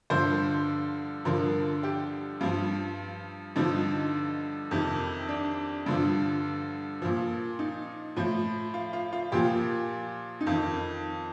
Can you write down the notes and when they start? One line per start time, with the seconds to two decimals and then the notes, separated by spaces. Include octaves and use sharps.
0.10 G2 D3 F3 C5
1.25 G2 D3 F3 A#4
1.83 G4
2.41 G2 F3 F4
3.56 G2 D3 F3 D#4
4.71 F2 C3 D#3
5.29 D4
5.86 G2 D3 F3
7.02 A#2 F3
7.59 D#4
8.16 A2 F3
8.74 F4
8.93 F4
9.13 F4
9.32 A#2 F3 G4
10.41 D#4
10.47 F2 D#3 F4